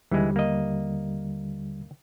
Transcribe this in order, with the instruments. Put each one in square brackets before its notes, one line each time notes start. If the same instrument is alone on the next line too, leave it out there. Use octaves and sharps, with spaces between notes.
[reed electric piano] D#2 D3 G3 [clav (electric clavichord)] E3 G#3
[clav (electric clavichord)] A#3 D#5